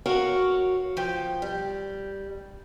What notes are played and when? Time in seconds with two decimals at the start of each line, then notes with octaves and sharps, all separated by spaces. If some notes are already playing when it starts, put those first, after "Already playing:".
0.06 F#4 A#4 C#5 F5 F#5
0.97 F3 G5
1.42 G3